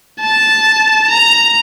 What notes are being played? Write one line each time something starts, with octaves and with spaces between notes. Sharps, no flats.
A5
A#5